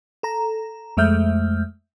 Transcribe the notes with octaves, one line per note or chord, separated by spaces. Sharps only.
A4 A#5
F2 G#3 A3 E5 F6 G6